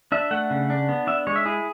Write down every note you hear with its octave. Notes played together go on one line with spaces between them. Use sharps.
D4 E5
A3 F#5
C#3
D4
B3
D4 E5
G#3 C#5
E5
E4 G#4